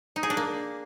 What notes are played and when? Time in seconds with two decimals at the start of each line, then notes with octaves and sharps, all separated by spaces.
0.16 D#4
0.23 G#4
0.30 D4
0.37 A#3